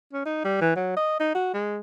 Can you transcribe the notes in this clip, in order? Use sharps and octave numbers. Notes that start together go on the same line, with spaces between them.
C#4
D#4
G3
E3
F#3
D#5
D#4
F#4
G#3